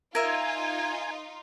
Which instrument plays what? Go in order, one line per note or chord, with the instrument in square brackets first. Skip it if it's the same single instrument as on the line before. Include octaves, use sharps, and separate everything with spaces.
[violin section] D#4 F4 [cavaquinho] A#4 E5 [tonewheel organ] G#5